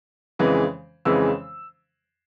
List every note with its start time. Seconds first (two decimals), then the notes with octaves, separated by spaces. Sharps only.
0.39 F2 C#3 E3 G#3
1.05 F2 C#3 E3 G#3 E6